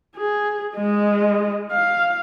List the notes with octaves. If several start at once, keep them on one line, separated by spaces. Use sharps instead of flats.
G#4
G#3 D#5
F5